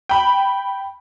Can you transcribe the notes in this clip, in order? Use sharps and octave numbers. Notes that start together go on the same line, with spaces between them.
G5 B5